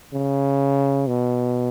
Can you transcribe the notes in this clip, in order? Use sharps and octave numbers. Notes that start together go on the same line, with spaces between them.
C#3
B2